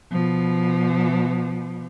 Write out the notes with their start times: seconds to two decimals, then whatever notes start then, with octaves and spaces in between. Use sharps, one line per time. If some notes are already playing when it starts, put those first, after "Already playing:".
0.12 B2 F3